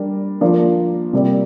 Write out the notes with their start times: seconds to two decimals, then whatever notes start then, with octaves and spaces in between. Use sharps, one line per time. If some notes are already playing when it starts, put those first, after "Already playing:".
Already playing: G3 D4 A#4
0.41 F3 A#3 D4
1.13 C3 G3 A#3 G4 D5